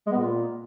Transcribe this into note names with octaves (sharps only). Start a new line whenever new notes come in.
G#3
B3
A#2